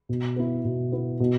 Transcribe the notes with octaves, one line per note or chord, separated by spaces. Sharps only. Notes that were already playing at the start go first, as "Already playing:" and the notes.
B2
B3 E4
B2
B3 E4
B2